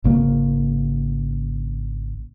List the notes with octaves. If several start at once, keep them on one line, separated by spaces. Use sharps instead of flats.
G#1 C#3 A#3